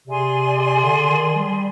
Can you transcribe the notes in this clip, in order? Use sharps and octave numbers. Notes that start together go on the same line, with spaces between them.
C3 G#4 D5 G#5 C6
D3
D#3
G3